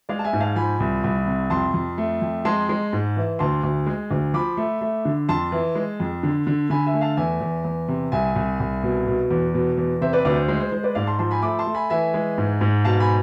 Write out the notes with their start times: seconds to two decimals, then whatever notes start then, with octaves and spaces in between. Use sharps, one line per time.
0.09 G#3 D5 F5
0.19 A5
0.25 E5 G#5
0.33 G#2
0.40 F5 A5
0.56 F3 G#5 B5
0.80 C2
1.04 C2
1.27 C3
1.50 F2 A5 C6
1.74 F2
1.98 A3
2.22 F2
2.45 G#3 A5 C6
2.69 G#3
2.93 G#2
3.16 E3
3.39 D2 A5 C6
3.63 D2
3.86 G#3
4.11 D2
4.34 F3 B5 D6
4.57 A3
4.81 A3
5.05 D3
5.29 F2 A5 C6
5.52 E3
5.75 G#3
6.00 F2
6.23 D3
6.47 D3
6.70 D3 G#5 B5
6.86 E5 G#5
6.94 A3
7.01 F5 A5
7.17 E2 E5 G#5
7.41 E2
7.65 E2
7.88 C3
8.12 C2 E5 G#5
8.36 C2
8.60 C2
8.83 B2
9.07 B2
9.31 E2
9.54 B2
9.78 E2
10.01 C3 C5 E5
10.13 B4 D5
10.25 D2 B4 D5
10.36 C5
10.48 G#3 C5
10.60 C5
10.72 G#3 C5
10.83 B4 D5
10.95 G#2 D5 F5
11.07 A5 C6
11.19 F3 A5 C6
11.31 G#5 B5
11.42 A3 B5 D6
11.59 A5 C6
11.67 A3
11.74 G#5 B5
11.90 E3 E5 G#5
12.14 G#3
12.38 G#2
12.61 G#2
12.85 B2 F5 A5
13.00 G#5 B5